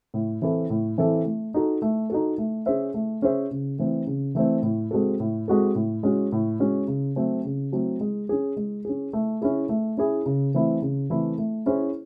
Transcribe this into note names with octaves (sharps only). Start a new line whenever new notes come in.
A2
E3 C4 E4 A4
A2
E3 C4 E4 A4
A3
D#4 F#4 A4
A3
D#4 F#4 A4
A3
C#4 G#4 C5 E5
A3
C#4 G#4 C5 E5
C#3
E3 A3 C4
C#3
E3 A3 C4
A2
G#3 C4 F#4 A4
A2
G#3 C4 F#4 A4
A2
G#3 C#4 F#4
A2
G#3 C#4 F#4
C#3
F#3 A3 C4
C#3
F#3 A3 C4
G#3
C#4 G#4
G#3
C#4 G#4
A3
C#4 E4 G#4
A3
C#4 E4 G#4
C#3
E3 A3 C4 E4
C#3
E3 A3 C4 E4
A3
C#4 E4 G#4 C5